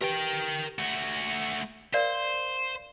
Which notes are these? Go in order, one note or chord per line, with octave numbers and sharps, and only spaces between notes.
G4 A#4 B4 G5
A3 F#4
A#4 C5 D5 F5